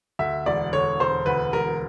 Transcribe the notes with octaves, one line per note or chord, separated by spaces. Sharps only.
D2 E5
E1 D5
D3 C#5
E1 C5
D2 B4
E1 A#4